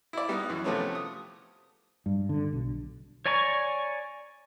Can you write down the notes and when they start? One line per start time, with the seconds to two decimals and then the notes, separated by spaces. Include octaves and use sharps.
0.13 E4 D5
0.29 G3 B3 D#4
0.49 F#2 E3
0.64 C3 F3 A3 B3 C#4
0.95 D#6
2.06 G2
2.29 D3
2.53 B1
3.26 C#5 D5 G#5 A#5 C#6